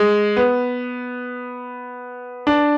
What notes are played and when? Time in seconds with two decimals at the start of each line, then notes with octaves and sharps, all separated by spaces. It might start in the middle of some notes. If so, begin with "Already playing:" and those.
Already playing: G#3
0.37 B3
2.47 D4